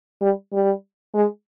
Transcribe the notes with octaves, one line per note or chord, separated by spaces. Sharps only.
G3
G3
G#3